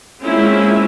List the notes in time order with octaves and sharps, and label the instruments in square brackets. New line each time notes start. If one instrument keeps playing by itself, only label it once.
[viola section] G#3 A#3 C4 C#4 E4 F4